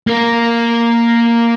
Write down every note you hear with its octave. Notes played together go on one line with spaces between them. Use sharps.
A#3 A#4